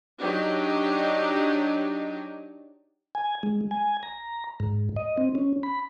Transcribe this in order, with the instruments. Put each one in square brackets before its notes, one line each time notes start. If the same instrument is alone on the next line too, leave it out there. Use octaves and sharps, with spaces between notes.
[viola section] F#3 D4 D#4 G4
[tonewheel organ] G#5
G#3
G#5
A#5
G#2
D#5
C4
C#4
B5